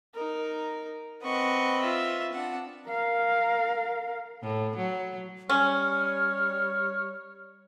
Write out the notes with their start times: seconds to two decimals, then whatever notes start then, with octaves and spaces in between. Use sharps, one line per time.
0.14 D#4 A#4
1.23 C4 B4 D#5 F#5 C#6
1.80 F4 E5
2.33 C4 D4 F#5
2.89 A#4 F5
4.42 A2
4.77 F#3
5.50 G3 C#4 C#5 F6